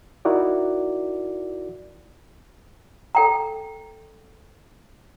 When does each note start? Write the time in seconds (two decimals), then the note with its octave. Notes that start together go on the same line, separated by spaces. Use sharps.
0.25 D#4 E4 F#4 A#4 D5
3.15 A4 G5 A#5